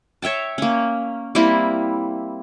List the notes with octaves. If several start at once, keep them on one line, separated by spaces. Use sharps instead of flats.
C#5 E5 G5 A5
A#3 C#4
G3 A#3 C4 E4